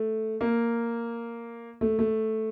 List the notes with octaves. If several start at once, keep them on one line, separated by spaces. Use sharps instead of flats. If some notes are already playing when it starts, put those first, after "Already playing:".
Already playing: A3
A#3
A3
A3